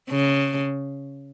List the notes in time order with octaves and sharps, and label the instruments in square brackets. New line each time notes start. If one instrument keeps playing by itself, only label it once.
[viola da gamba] C#3